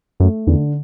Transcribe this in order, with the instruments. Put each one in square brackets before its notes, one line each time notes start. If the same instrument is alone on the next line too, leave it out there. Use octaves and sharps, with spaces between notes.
[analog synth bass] F#2 [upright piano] A3
[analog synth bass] E2 [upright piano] D3